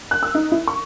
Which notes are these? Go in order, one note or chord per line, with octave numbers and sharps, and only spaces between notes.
F#6
E6
D#4
E4
C#6